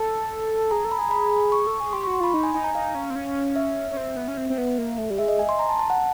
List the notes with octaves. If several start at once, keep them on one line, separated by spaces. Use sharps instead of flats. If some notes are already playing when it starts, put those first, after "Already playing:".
Already playing: A4 A5
G#4 A#5
A4
B5
G#4 A#5
B5
C#6
A4
G#4
G4 C6
F#4 C#6
C6
F4 B5
D#4
G#5
D#4 G#5
A#5
D#4 F5
C#4
C4
C#4
E5
C#4
C4
B3
C#4
C4
C4
B3
A#3
A3
G3
G#3 E5
D#5
G#5
C6
A#5
A5
A5
F#5